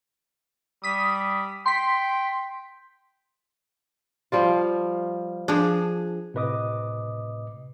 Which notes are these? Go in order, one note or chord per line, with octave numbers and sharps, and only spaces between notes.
G3 D#6 B6
G5 C6 B6
F3 G3 F4
F3 D4 G#4
A2 C3 B4 D#5 D6 D#6